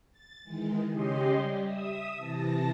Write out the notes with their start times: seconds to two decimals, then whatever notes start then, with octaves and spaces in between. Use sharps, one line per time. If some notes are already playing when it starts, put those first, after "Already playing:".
0.12 A6
0.44 D#3 E3 G#3
0.89 C#3 C#4 G4 D#5 C6
1.32 G3
1.64 E5 D#6 E6
2.16 C3 E3 A5 A#6